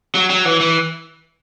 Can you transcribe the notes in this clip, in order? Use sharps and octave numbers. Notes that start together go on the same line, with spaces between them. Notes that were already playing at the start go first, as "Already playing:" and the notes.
F#3
F#3
E3
E3